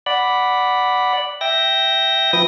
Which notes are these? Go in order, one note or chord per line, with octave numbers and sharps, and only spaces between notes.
D5 F#5 B5
E5 G5 A#6
F3 B4 D#6 A#6